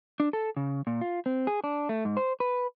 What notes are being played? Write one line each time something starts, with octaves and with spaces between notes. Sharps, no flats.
D4
A4
C#3
A#2
F4
C4
G#4
D4
A3
G#2
C5
B4